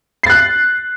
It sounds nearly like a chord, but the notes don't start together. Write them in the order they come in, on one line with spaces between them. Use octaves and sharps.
C7 A6 F#6